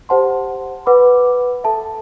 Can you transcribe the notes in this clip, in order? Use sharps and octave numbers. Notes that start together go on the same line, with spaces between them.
G4 C5 F#5 A5 C6
B4 F#5 B5 D6
A4 E5 A5